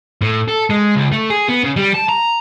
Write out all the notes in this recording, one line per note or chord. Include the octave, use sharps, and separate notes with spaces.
A2
A4
G#3
C#2
A3
G#4
B3
C#3
G3
A5
A#5